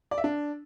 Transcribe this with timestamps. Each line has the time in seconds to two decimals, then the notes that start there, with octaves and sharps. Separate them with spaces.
0.11 D5
0.18 E5
0.24 D4